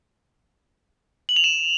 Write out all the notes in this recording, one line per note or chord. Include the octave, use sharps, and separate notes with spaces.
F#7
F7
E7